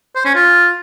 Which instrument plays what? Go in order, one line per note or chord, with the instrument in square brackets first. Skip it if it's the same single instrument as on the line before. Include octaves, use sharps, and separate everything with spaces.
[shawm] C5
C#4
F4